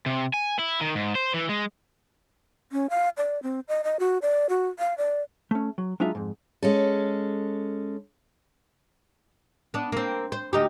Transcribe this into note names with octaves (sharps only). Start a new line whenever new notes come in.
C3
G#5
E4
D#3
G#2
C5
E3
G#3
C#4
F5
D5
C4
D#5
D#5
F#4
D5
F#4
F5
D5
A3 C#4
F#3
F#3 G#3 D4 D#4 F4 E5
F2 G#2
G#3 C#4 A4
B3 D4
A#3 C4
C5
D2 D#4 G4